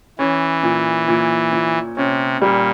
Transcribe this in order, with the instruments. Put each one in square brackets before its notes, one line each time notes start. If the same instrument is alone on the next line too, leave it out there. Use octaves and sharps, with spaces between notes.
[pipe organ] E3 [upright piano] C#4
[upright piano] A#2
A#2
A#2
[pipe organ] C3 [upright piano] C#4
[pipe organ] A#2 [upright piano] G3